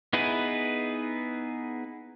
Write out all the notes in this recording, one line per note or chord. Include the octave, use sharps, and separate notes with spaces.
B3 D#4 E4 G#4 B4